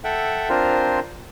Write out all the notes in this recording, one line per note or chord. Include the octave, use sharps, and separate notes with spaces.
A4 E5 F#5 G5
C4 D4 F4 A#4 C5